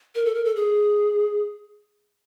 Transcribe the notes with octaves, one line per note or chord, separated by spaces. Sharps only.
A#4
A4
A#4
A4
G#4